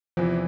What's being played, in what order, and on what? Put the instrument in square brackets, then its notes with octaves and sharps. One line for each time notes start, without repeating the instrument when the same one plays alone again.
[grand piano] E2 C3 E3 [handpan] F3